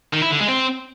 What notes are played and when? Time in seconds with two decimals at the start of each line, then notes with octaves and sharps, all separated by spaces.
0.14 D#3
0.22 E4
0.31 D3
0.40 G#3
0.49 C4